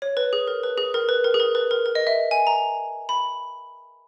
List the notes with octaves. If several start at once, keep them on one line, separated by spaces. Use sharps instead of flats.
C#5
B4
G#4
A#4
B4
G#4
A#4
B4
A#4
G#4
A#4
B4
A#4
A#4
D#5
E5
G#5
A#5
B5